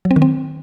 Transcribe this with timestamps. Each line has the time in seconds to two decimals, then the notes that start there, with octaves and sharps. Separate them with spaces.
0.05 F#3
0.11 C4
0.16 D#3
0.22 C4